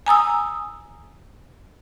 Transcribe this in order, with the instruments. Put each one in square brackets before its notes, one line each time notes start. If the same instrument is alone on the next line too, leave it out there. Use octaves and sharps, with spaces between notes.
[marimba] G#5 A#5 D#6 E6